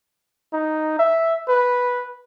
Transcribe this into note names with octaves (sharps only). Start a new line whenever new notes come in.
D#4
E5
B4